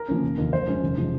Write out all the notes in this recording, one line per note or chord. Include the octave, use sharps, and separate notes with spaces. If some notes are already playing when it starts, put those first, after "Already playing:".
Already playing: A#4
F3 A#3 C#4
F1
D#2 D#3
F#2 C5
F3 G#3 C#4
F1
C#3 F3 G#3